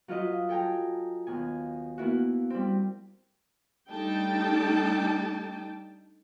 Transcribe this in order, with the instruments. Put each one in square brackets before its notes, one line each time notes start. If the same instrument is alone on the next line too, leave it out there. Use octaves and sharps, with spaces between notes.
[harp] F#3 F4 B4 D#5
A4 G5 G#5 A#5
D#2 B2 G#5
A#3 B3 E4 F#4
G3 C4
[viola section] G3 A3 D4 D#4 G5 A5